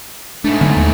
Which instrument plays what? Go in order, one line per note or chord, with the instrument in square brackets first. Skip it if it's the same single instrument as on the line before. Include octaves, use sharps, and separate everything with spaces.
[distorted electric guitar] G#2 A3 [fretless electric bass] D4
[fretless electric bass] D3 F#3 B3
D#2